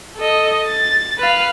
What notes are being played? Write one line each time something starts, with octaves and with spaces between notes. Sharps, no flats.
A4 D#5
A6
B4 F5